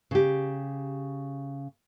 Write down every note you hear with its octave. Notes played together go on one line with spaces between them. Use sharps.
C#3 G4